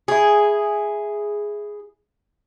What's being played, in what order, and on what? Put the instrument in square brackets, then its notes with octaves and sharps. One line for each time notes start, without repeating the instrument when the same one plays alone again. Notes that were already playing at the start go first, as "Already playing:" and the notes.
[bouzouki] E4 G#4